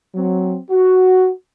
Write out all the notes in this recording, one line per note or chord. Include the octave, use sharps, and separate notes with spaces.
F#3 C4
F#4